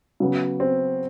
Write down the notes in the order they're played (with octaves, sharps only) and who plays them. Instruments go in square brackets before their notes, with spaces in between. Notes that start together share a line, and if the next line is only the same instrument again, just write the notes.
[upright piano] C#3 F#3 B3
[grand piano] C4